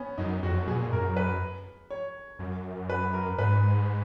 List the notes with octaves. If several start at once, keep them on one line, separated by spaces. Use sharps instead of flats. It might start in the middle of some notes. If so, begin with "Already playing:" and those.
Already playing: B3 C#4
F#2 D#4
F2 F#4
F#2
B2 G#4
A#2
F#2 A#4
B4
C#5
F#2
B4
A#4
G#2 B4